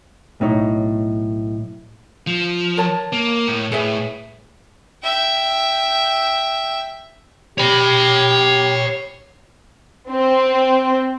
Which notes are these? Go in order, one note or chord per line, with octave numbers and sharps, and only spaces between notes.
B1 A2 D#4 C#5
F3
A#4 C#5 A5
A#3
A2
A2 G#4 B4 E5
E5 G5
G4 C#5 B5
C4